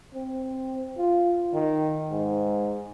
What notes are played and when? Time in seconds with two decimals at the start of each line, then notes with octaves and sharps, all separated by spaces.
0.14 C4
0.98 F4
1.54 D#3
2.11 G#2